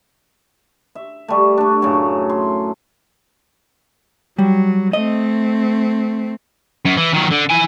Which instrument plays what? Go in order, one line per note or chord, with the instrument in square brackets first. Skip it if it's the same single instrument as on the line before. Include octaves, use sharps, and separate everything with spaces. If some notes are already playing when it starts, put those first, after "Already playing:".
[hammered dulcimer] E5
G3 A3
A3 D4
F#2 A2 C#3
C6
[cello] F#3 [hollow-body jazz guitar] G3
[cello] A3 C4 [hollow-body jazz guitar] D#5
[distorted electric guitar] F#2
E3
D#3 F#3
D3
E4 G#5